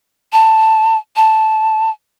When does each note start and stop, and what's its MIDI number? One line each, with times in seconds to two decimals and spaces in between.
0.33 0.97 81
1.16 1.90 81